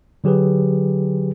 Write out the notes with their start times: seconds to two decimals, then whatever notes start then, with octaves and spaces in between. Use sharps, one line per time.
0.24 D3 F#3 G4 G#4 B4